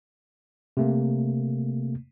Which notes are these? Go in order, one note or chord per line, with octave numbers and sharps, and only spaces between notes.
C3 A3 A#3